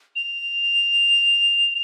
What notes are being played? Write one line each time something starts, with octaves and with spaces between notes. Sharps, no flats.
F7